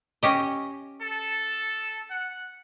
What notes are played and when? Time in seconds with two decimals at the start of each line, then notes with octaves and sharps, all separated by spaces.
0.23 C#4 G4 D#5
1.02 A4
2.08 F#5